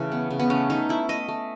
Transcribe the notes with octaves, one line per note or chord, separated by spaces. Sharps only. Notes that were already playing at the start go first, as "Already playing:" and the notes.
Already playing: C#3 E3 A3
B3
C#3
B3
A3 C#4
A3 D#4
A3 E4
A3 D#5
A3